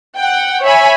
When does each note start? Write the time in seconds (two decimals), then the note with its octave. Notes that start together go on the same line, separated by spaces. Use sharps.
0.17 F#5 G5
0.65 C#5 E5 G#5 B5